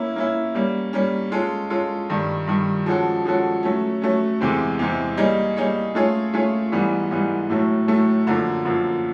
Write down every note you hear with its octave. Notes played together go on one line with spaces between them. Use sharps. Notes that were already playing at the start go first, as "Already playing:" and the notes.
Already playing: A#3 C#4 E4
A#3 C#4 E4
G3 A#3 C#4
G3 A#3 C#4
G#3 C#4 F4 A4
G#3 C#4 F4 A4
G2 D#3 G3
G2 D#3 G3
F3 G#3 C#4 F#4 A4
F3 G#3 C#4 F#4 A4
F#3 A3 C#4
F#3 A3 C#4
E2 C3 E3 G#3 C4
E2 C3 E3 G#3 C4
G3 A#3 D#4 G#4 C#5
G3 A#3 D#4 G#4 C#5
A3 C#4 F4 G#4 C#5
A3 C#4 F4 G#4 C#5
G#2 E3 G3 B3
G#2 E3 G3 B3
A2 F#3 A3
A2 F#3 A3
F#2 D3 F3 A#3
F#2 D3 F3 A#3